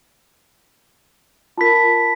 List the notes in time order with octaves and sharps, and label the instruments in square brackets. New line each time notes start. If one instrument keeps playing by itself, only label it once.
[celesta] F4 A#4 [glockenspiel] A5 B5 B6